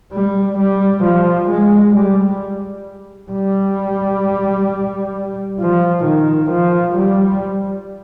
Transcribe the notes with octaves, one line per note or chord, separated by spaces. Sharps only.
G3
G3
F3
G#3
G3
G3
F3
D#3
F3
G3